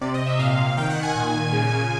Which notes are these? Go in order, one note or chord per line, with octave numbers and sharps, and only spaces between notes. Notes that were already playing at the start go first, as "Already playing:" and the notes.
C3 D5
D#5
C3
E5
A#2 F5
A#2
D#3 G5
F#5
D#3
G#5
A#2
A#2
C#3
C#3